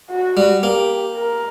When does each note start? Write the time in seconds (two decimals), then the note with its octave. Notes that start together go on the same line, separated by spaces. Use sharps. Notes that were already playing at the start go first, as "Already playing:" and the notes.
0.11 F#4
0.37 G3
0.63 A#3 G4
1.16 A#4